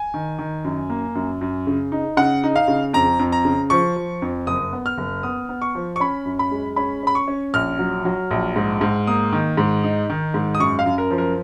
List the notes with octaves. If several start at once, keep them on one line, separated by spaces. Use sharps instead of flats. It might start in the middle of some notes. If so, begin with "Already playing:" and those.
Already playing: G#5
D#3
D#3
F#2
A#3
F#2
F#2
C#3
D#4
C#3 F#5
D#4
F5
C#3
F2 A#5
F2
A#5
C#3
F3 C#6
F3
F2
F#1 D#6
B3
F6
F#1
B3 D#6
B3
C#6
F3
C#6
C#4 B5
F#2
B5
G#3
C#4 B5
C#4 B5
C#6
C#4
A#1 F6
F#3
F#3
A#1
G#2
G#2
A#3 D#6
D#3
G#2
D#4
D#3
G#2
D#6
F#2 C#6
F5
F#2
A#4
F3
A#4